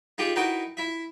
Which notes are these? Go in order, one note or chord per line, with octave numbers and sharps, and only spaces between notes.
D#4 F4 G4 G#4
D#4 E4 F#4 A#4 B4 G5
E4 E5